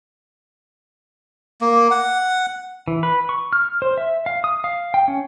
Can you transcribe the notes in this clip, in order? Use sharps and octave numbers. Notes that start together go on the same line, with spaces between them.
A#3
F#5
E3
B4
C#6
F6
C5
E5
F5
D#6
F5
G5
C#4